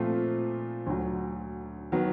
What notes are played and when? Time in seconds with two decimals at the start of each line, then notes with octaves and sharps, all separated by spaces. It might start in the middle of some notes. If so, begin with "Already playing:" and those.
Already playing: A#2 F3 A3 C4 F4
0.86 D2 D3 F#3
1.92 D#3 F#3 B3